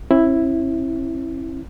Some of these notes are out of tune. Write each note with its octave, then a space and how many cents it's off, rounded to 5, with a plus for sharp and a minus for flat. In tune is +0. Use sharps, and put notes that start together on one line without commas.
C#4 -45 E4 +0